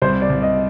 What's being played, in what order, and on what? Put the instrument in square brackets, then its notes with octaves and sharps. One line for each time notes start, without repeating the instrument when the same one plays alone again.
[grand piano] C2 [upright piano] C5
[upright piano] D5
[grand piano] C2
[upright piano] D#5